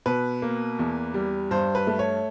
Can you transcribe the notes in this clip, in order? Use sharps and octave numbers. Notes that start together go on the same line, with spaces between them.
B2 B4
A#3
E2
G3
G2 C5
B4
A3
C#5